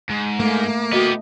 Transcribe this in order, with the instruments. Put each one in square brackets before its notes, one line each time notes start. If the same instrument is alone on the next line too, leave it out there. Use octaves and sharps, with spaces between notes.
[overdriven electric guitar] G#2
[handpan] A3 [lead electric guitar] A#3
[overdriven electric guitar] B3 G4 [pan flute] F#4 [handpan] D#5